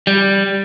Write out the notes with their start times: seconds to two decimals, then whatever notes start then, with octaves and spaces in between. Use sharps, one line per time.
0.07 G3